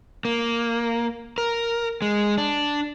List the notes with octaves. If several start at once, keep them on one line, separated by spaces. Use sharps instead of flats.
A#3
A#4
G#3
D4